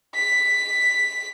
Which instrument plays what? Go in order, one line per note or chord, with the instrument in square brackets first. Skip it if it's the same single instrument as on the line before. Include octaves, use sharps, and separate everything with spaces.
[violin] B6